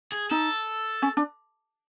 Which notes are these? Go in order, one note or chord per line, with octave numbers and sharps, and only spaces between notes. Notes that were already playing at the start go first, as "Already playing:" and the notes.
G#4
D#4 A4
C#4
D4